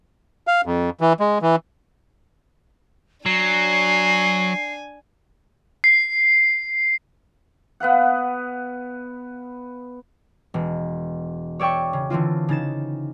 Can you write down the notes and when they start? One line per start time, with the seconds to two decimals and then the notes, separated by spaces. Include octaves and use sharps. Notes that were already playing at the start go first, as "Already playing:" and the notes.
0.47 F5
0.66 F2
1.01 E3
1.20 G#3
1.42 E3
3.26 F#3 D4 G#5 C7
5.84 C7
7.80 B3 B4 F5 F#5
10.54 E1
11.59 C#5 D5 E5 G5 C#6
11.93 C#3
12.10 D3 E3 C4 F4
12.49 C#3 D#4 A6 E7